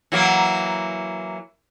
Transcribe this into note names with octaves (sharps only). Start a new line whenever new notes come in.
E3 F#3 A#3